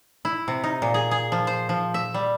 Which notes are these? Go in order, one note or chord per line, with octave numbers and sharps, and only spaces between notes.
E4
C3
D#4
A#2
G#4
G#4
F3
C5
F3
E5
G3